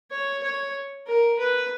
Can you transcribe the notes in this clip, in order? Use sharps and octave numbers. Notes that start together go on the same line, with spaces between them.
C#5
C#5
A#4
B4